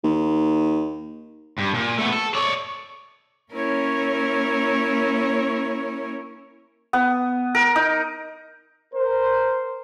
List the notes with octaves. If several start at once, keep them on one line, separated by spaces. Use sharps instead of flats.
D#2
G2
A#2
A3 B3
A4
C#5 D5
A#3 C#4 E4 A#4 C#5
B3
A#4
D#4
A#4 C5